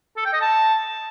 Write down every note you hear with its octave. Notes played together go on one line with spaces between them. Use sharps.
A4
G5
D#5
A5